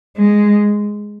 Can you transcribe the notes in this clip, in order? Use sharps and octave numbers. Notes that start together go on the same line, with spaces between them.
G#3